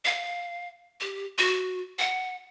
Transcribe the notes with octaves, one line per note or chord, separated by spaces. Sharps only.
F5
G4
F#4
F#5